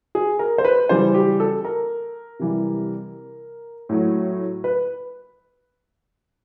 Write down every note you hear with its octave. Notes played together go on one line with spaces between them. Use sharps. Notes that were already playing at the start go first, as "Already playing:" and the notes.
G#4
A#4
C5
B4
C#3 E3 G3 C5
G4
A4
A#4
C3 E3 G3
A2 F#3
B4